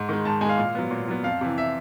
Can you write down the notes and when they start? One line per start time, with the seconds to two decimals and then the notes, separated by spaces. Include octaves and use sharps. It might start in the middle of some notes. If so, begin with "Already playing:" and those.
Already playing: G#2
0.09 D#3 G#3
0.25 G#2 A5
0.41 G#3 G#5
0.45 D#3 F5
0.57 A#2 F5
0.75 F#3 B3
0.91 A#2
1.08 F#3 B3
1.24 F2 F5
1.41 C3 E3
1.58 E5